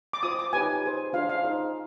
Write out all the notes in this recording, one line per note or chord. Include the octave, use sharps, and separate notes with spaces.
D6
F4 C5 D#6
D6
D#4 G4 B4 G#5
D#4 G#4 C5
D4 F4 G#4 C5 F5
F5
D#4 G#4 C5